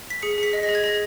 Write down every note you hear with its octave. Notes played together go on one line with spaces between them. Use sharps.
B6
G#4 C#7
G#4
B6
D#5
A#6
G#4
G#6
G#4 A#6